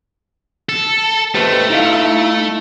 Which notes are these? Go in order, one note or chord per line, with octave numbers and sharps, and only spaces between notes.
A4
A3 G4 B4 C5
D#4 E4 F5